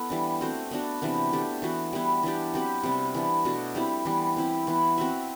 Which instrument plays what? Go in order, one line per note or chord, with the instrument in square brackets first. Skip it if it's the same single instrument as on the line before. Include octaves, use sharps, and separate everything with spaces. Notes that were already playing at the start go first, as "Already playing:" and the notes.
Already playing: [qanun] B3 E4 A4
E3 G3 D4
A3 C4 F#4 C5
B3 D4 F#4
C3 E3 B3 D4
A3 D4 G4
E3 B3 F#4
G3 B3 E4
E3 B3 D4 G4
F#3 C4 G4 B4
C3 G3 B3
E3 B3 D4
B2 A3 D4 F#4
G3 C4 E4
E3 G3 B3
C4 E4 G4
E3 B3 E4
C4 F#4 B4 E5